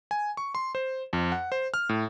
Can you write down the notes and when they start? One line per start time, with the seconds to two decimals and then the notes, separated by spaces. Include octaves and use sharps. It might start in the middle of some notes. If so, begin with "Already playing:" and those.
0.11 G#5
0.37 C#6
0.55 C6
0.75 C5
1.13 F2
1.32 F#5
1.52 C5
1.74 F6
1.89 A2